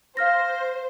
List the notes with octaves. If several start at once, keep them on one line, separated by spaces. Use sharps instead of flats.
C5 F5 F6 A#6